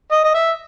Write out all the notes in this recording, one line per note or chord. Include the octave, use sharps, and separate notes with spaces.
D#5
D#5
E5